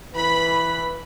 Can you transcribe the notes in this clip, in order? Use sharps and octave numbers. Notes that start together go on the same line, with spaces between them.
E3 B4 B5